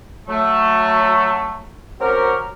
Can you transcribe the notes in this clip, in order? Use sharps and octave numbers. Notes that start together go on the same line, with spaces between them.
F#3 A3
F#3 C4 C#4 F#4 G4 A#4